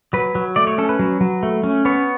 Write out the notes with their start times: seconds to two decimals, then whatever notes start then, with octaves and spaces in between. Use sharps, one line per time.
0.13 F#3 B4
0.35 F#3
0.56 A3 D5
0.67 C#5
0.78 C#4 A4
0.89 B4
0.99 F#3
1.21 F#3
1.43 A3
1.63 C#4
1.85 B3 C#5